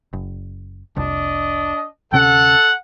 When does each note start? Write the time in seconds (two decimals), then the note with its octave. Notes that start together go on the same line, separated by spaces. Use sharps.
0.13 F#1
0.96 F1 C2 D4 D#5
2.13 D2 C3 C#4 A4 F#5